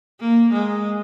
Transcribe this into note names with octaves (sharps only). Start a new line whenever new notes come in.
A#3
G#3